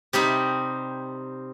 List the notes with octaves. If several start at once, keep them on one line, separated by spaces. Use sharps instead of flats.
C3 G3 D#4 B5